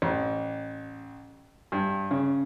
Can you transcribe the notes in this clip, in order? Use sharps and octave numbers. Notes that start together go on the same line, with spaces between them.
A1
G2
C#3